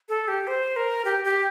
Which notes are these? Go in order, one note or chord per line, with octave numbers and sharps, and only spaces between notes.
A4
G4
C5
A#4
G4
G4